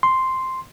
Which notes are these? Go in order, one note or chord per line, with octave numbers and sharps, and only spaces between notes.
C6